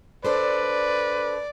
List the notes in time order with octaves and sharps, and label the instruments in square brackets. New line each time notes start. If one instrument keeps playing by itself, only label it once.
[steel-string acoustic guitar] D4 A4 C5 [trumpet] B4 [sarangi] D5